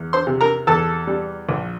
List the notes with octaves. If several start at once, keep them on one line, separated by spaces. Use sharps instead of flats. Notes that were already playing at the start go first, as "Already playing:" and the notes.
Already playing: E2
C5 C6
C3
A#4 A#5
E2 A4 A5
G3
A#1